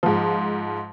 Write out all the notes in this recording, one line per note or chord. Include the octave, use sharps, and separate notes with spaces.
G#2 F3